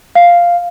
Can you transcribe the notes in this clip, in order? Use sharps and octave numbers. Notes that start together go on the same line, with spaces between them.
F5